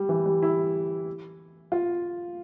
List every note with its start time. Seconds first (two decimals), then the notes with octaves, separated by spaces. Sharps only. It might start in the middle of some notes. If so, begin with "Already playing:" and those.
Already playing: G3
0.09 E3
0.26 G3
0.43 E4
1.72 F4